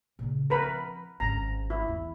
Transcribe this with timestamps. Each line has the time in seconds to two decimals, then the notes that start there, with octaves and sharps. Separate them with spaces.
0.19 A#2 C#3
0.50 F3 C4 A#4 B4 B5
1.20 G#1 C#4 A#5
1.70 E4
1.88 E2